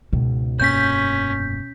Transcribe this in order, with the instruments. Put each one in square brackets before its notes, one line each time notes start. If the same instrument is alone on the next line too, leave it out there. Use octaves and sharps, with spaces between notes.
[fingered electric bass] C#2 G#2 [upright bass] B2
[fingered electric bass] F1 G2 A#3 [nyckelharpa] C#4 [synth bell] G6 B6